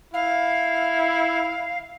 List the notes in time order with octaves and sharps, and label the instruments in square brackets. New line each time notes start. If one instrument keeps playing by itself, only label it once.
[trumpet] E4 [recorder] F5